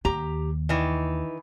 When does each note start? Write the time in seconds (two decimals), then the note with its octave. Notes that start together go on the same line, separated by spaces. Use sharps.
0.05 D#2 G4 A#5
0.69 D#3 E3